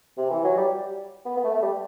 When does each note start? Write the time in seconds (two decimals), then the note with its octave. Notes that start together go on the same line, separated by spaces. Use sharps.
0.18 C3
0.30 E3
0.44 F#3
0.57 G3
1.25 B3
1.37 B3
1.44 A3
1.54 A3
1.62 G3